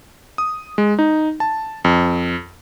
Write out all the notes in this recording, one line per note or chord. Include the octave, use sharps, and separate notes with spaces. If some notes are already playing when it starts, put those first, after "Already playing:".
D#6
G#3
D#4
A5
F2